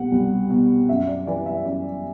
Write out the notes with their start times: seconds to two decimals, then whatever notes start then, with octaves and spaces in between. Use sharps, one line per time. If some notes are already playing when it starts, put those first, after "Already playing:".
Already playing: C2 B2 F#5
0.12 C2
0.50 B2
0.88 F#2 E5
1.08 D5
1.27 E3 D5
1.46 E5
1.65 F#2 D5